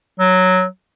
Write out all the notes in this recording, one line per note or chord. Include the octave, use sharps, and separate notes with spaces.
F#3